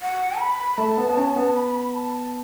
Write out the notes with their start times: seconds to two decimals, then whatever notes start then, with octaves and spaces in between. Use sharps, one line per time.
0.02 F#5
0.39 B5
0.78 A3 A5
0.98 B3
1.10 B3
1.17 C#4
1.36 B3
1.55 B5
1.94 A5